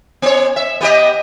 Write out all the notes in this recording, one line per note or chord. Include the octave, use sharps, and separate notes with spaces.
B3 C#5
E5
B3 G4 D#5